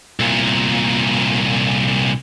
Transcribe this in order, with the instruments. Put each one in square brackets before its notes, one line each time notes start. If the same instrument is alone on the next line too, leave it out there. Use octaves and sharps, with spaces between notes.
[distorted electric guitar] C2 A#2